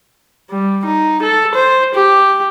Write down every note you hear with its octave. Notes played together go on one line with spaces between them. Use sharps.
G3
D#4
A4
C5
G4